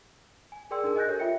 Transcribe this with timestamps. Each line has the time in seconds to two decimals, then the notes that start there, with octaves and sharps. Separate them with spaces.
0.52 G#5
0.71 G#4 A#4 D5 G5 C6 E6
0.84 D4 D#4 G#4 A#4
0.96 D#5 G#5 F#6 G6 A#6
1.08 G4 A4 A#4 C#5
1.20 F4 E5 G5 C#7